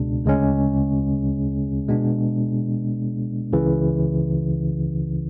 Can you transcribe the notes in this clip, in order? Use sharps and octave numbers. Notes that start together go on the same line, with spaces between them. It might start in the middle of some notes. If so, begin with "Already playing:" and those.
Already playing: C#2 B2 G#3 D4
D2 C#3 G#3 C#4
B2 G#3 B3 D4
C#2 C#3 E3